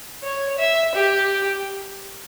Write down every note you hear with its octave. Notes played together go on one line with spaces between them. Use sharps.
C#5
E5
G4